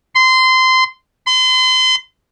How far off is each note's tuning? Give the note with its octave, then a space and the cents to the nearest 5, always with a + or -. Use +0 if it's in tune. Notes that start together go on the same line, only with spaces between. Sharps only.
C6 -20
C6 -35